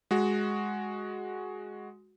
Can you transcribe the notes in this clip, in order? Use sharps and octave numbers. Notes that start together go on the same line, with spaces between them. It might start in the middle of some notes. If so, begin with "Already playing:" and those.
G#3 F#4